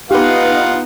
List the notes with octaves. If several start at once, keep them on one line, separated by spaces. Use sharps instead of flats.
B3 D#4 F4 G4 B4 F5 F#5